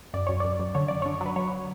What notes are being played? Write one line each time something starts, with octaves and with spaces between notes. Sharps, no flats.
F#2 D5
F#2 C#5
F#2 D5
F#2
D3 C#5
F#2 D5
D3 C#5
F#3 B4
F#3 C#5